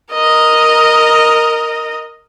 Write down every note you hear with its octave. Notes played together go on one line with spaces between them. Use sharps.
A#4 D#5